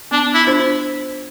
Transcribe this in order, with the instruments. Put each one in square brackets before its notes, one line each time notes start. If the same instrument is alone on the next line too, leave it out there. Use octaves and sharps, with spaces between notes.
[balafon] B3 [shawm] D4
[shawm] E4
[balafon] D4 F4 C5